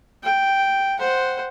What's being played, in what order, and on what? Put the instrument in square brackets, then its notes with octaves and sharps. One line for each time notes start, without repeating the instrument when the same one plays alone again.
[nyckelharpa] G5
C5 F#5